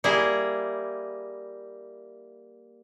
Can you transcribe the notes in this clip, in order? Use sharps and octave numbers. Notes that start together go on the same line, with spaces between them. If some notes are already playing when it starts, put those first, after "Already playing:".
G3 A#3 E4 G#4